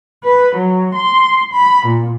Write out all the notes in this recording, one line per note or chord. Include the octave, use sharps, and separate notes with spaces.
B4
F#3
C6
B5
A#2